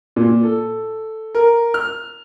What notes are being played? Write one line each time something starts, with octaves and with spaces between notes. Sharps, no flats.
A#2
A4
A#4
F6